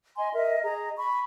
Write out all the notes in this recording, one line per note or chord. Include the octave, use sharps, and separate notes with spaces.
D#5 G#5 C6
A#4 D#5 E5
G#4 D#5 A#5
B5 C#6